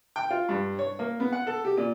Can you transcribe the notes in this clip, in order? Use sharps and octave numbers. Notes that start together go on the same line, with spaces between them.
G5
F4
G2
C#5
A#3
B3
F#5
A4
G4
A#2